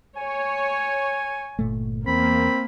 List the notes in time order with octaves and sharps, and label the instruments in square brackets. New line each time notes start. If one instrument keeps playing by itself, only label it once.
[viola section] C#5 [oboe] G#5
[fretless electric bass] G1 A#2 A3
[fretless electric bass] E2 [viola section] A#3 [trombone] C4 [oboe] B5